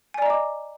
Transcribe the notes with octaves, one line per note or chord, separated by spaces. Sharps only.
D5 D#5 G#5 A#5 D6